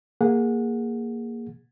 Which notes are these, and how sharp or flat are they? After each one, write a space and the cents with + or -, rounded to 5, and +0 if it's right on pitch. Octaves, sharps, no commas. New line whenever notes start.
A#3 +0 G#4 -15 F#5 -20